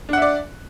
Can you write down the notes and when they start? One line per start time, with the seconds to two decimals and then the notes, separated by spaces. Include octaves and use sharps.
0.09 D4
0.13 F#5
0.18 E5
0.22 D5